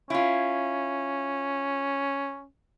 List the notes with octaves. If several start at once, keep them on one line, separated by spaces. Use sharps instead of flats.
C#4 E4 F4